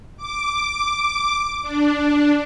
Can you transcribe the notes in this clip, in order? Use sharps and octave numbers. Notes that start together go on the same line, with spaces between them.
D6
D4